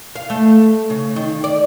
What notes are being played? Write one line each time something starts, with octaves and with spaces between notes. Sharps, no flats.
F5
A3
C#3
D#3
D5